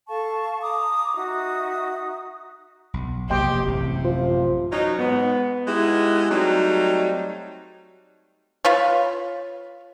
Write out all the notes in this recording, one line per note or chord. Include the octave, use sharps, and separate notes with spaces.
A4 F5 A5 C#6
A#5 D6 D#6
D#4 F#4 E5 D#6
B1
F1 A#3 G4 D#5 G5 C6
A1 F#2 C3
F3 F4
F#3 C#4 D#4
G#2 B3
G#3 B3 D#4 E4 G4
F#3 G3 A3 C4 D#4
F4 B4 C#5